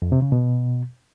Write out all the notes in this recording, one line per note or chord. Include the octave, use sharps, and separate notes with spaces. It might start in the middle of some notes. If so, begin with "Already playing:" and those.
F2
C3
C#3
B2